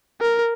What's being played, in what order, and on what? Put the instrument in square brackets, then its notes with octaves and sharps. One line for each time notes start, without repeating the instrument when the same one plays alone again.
[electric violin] A#4